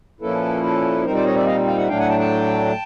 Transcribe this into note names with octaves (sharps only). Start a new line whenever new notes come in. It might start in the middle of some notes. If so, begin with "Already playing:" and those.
A#2 F3 A#3 C#4 E4 A4 B4
A4 B4
A#2 G3 C4 D#4 A#4 C5
C5 D5
C#5 D#5
D5 E5
D#5 F5
F5 G5
E5 F#5
A2 F#3 A3 D4 F5 G5
F#5 G#5
G5 A5
G5 A5